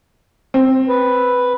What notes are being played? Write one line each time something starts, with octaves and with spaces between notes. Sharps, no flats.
C4
B4